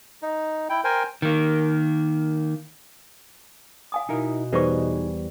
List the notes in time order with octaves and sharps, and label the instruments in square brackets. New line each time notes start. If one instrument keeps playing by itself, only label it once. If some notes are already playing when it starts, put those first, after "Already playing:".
[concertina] D#4
E4 G5
A#4 C5 G5 G#5
[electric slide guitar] D#3 A#3
[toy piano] F5 G#5 D#6
[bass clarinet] B2 [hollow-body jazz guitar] D#4 E4 A#4
[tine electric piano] E2 G3 [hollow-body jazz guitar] D#4 G#4 D#5 [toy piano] B4 C5 C#6